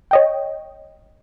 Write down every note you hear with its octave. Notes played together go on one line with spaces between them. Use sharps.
C#5 D#5 G5